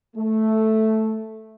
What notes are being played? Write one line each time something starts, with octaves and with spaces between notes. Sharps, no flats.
A3